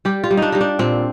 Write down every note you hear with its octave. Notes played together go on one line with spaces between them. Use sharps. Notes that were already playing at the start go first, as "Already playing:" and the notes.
G3 G4
F4
G3
D4 D#4
G3 D#4
D4
A#2 C4